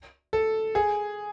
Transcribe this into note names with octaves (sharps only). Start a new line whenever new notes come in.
A4
G#4